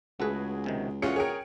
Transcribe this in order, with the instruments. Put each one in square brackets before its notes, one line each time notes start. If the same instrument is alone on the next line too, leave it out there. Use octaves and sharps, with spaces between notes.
[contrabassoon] C#2 [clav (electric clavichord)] A3 E4 B4 [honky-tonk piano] F#4 G#4
[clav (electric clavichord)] B1 C3 D#3
[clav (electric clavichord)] A#2 E3 F#4 [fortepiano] G#3 C#4 F4 [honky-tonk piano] C#7
[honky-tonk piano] G#4 G5 D7 [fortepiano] A#4 C#5